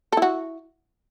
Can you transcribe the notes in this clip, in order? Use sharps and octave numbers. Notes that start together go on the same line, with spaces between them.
E4 F#4 A4